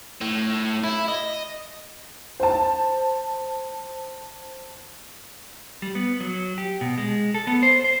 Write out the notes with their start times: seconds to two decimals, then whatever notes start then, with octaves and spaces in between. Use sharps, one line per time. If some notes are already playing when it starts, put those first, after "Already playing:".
0.21 A2
0.84 E4
1.08 D#5
2.40 C5 A5
5.82 G3
5.95 B3
6.20 F#3
6.58 G4
6.81 B2
6.98 G#3
7.34 A4
7.47 B3
7.63 C5
7.84 C5